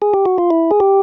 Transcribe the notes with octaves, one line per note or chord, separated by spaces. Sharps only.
G#4
G4
F#4
F4
E4
G#4
G4